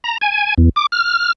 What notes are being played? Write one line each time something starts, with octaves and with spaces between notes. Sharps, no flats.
A#5
G#5
E2
D6
F6